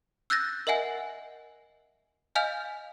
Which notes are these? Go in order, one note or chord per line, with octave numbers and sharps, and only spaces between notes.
E6 F#6 G6 A6 A#6
A#4 D#5 E5 F#5 G#5
D#5 F5 G#5 F6 G6 F7